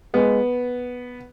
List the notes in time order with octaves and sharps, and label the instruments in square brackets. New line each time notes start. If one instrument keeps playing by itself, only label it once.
[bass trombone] G#3 [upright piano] B3